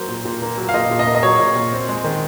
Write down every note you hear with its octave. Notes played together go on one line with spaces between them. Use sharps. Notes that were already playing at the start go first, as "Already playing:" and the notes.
Already playing: F#3 A#3 C5
A#2
A#2
A#3
F#3
F5
A#2 D#5
A#2
D#5
A#3
D#5
F#3 C#5
A#2
A#2
C4
G#3
D#3